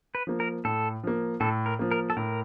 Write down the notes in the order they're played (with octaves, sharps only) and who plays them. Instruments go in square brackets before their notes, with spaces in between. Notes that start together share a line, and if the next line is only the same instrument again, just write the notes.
[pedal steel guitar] B4
[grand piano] F3 A#3
[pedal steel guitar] A#4
[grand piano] A2 [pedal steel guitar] A4
[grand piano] F3 A#3
[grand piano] A2 [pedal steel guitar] A4
[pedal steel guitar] A#4
[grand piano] F3 A#3
[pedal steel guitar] A#4
A4
[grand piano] A2 [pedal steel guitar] A#4